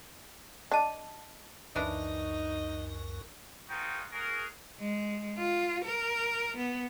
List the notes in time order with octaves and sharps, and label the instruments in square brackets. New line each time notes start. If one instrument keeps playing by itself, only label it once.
[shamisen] D4 [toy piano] D#5 A5
[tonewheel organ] C#2 F#2 A#4 [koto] E3 D4 [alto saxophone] D#4
[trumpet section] B3 D#4 F4 F#4 G#4 G5
F#4 G#4 A#4
[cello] G#3
F4
A#4
B3